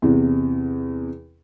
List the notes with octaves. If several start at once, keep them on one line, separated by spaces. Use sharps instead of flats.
E2 C3